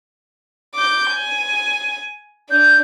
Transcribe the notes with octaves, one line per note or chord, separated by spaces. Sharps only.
D6 G6
G#5
D4 G6